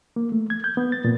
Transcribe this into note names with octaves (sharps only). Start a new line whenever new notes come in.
A#3
A3
G#6
G6
B3
A6
A#2